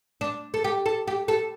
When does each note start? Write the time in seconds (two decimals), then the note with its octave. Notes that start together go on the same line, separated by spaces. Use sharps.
0.21 D4
0.54 A4
0.64 G4
0.86 A4
1.07 G4
1.28 A4